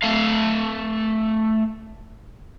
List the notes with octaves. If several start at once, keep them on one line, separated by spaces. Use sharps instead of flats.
A3 F5